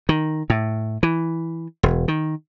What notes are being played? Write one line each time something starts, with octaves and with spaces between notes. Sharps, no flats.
D#3
A2
E3
E1
D#3